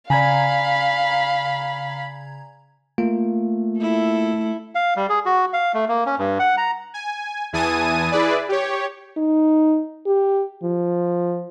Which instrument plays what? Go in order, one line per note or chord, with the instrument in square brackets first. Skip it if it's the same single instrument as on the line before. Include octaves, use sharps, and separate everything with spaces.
[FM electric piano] C#3 A#5 G#6 [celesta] D5 G#5 [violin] F5 [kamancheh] B5
[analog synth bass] A3 [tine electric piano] A#3 F4
[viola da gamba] E4 A4
[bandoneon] F5
G3
G#4
F#4
F5
A3
A#3
C#4
G2
F#5
A#5
[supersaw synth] G#5
E2 E3 G#5 A5 D#6 D#7
E4 G#4 B4 D5
G4 C#5
[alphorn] D#4
G4
F3